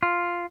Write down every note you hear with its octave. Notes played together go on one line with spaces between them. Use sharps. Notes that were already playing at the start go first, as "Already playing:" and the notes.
F4